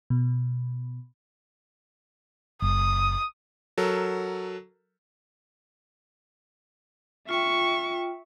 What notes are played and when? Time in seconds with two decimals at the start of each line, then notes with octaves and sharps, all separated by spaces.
0.10 B2
2.62 F#1 D#6
3.78 F#3 A4 A#4
7.29 F4 E5 G5 C#6